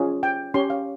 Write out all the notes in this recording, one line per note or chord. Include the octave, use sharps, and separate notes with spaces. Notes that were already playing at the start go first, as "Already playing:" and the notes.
Already playing: C#4 F4 G#4
G5
C#4 G4 C#5 C6
F5